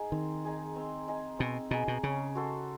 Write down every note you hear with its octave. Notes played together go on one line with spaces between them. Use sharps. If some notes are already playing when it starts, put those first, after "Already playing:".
Already playing: D#4 G#4
D#3 C4
D#4 G#4
C4
D#4 G#4
B2 C4
B2 D#4 G#4
B2
C#3 C#4
F#4 A4 C5